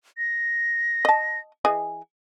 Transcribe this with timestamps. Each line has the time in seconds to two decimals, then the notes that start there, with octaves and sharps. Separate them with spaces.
0.18 A#6
1.05 D#5 A5
1.65 E3 G#4 D#5